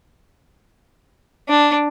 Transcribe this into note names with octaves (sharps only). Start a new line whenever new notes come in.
D4